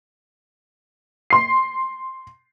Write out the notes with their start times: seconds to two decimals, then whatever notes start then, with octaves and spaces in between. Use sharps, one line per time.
1.30 C6 C7